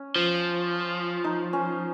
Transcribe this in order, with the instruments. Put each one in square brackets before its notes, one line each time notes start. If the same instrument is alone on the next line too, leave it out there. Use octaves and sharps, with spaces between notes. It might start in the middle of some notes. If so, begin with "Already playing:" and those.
Already playing: [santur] C#4
[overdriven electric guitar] F3
[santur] D#4
C#4